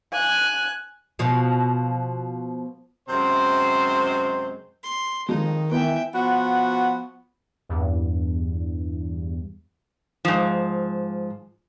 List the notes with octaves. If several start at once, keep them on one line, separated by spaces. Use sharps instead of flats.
G#5 F#6
B2 F3
F#2 C3 G#3 C5
C6
F2 D#3 F3 G#3 D#4
E3 B3 E5 G5
F3 B3 F#4
E2 G2
G#2 F3